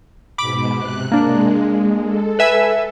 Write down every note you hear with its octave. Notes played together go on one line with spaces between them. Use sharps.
G#2 B2 B5 D6
C3 F#6
G#3 A#3 D4
A4
B4 E5 G#5